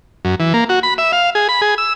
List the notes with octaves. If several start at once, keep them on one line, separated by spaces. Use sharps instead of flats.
F#2
E3
A#3
F#4
B5
E5
F5
G#4
B5
G#4
E6